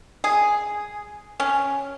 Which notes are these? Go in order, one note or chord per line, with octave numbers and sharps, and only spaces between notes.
G#4
C#4